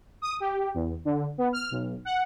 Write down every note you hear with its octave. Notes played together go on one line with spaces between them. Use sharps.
D#6
G4
E2
D3
B3
F6
B1
F#5